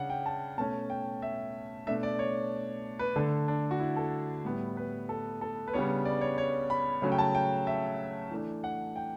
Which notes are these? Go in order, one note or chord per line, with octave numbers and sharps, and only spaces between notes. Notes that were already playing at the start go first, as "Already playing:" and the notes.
Already playing: C#3 D4 F#5
G5
A5
B2 A3 C#4 A5
G5
E5
B2 A3 D4 E5
D5
C#5
B4
D3 A3 D4 A4
D4
F#4
E4
A4
A2 G3 B3
B4
A4
A4
B4
C#3 G3 B3 D4 C#5
D5
C#5
C#5
B5
C#3 F#3 A3 C#4
G5
A5
G5
E5
E3 A3 D4
F#5
G5